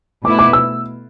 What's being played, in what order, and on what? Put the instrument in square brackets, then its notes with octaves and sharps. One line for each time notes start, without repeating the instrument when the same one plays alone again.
[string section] B2 A3 E4 B4 [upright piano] D6
[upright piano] D6
E6